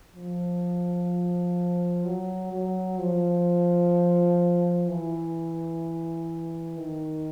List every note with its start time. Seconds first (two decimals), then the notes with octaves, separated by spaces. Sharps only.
0.15 F3
2.04 F#3
2.52 F#3
2.99 F3
4.88 E3
6.77 D#3